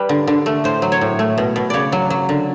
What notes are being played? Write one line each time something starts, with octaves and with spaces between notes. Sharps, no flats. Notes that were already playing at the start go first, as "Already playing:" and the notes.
Already playing: G3 B4
D3
D3
A3
A2 C5
F#3
C#5
A2
A3
B2
B2
C#3 C#5 D5
F#3
F#3
D3